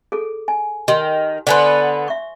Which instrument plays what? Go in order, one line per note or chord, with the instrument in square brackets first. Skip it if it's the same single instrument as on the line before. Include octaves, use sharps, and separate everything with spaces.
[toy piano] G#4 A4
G#5
[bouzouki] D#3 [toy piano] G4
[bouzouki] D3 B3 B4 [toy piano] C5 G#5 C6
[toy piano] E5 C#6